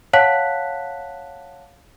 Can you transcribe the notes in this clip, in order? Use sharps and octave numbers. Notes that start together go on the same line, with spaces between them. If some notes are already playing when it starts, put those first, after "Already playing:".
C#5 F5 F#5 A5 F#6 B6